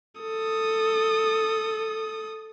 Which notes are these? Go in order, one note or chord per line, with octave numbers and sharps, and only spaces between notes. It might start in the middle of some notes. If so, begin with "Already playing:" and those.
A4 D#6